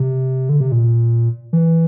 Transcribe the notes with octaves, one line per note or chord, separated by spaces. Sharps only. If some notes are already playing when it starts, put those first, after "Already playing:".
Already playing: C3
D3
C3
A#2
E3